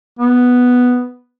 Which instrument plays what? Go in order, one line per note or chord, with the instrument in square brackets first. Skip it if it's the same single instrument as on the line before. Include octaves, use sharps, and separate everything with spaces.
[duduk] B3